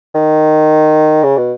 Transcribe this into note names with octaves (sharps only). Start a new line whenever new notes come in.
D#3
C#3
B2